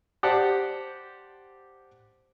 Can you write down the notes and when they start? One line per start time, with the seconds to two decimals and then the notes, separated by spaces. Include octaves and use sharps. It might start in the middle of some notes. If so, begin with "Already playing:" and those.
0.23 G4 C5 D5 F#5 A5